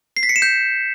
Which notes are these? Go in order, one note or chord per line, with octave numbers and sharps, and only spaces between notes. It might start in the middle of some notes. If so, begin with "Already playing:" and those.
C7
B6
C#7
E7
G6